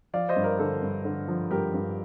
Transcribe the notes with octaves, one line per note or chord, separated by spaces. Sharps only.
F3 D5 F5
C5 D#5
G2
A#4 D5
D3 A4 C5
G2
D3
F3
G2 G4 A#4
G2